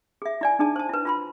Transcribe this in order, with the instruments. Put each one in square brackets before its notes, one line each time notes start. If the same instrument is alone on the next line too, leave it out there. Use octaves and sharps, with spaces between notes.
[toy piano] G#4 E5
E4 D5 G#5
D4 D#4 G#4 D5 A5
C5 A5
E4 B4
F4 B5 C6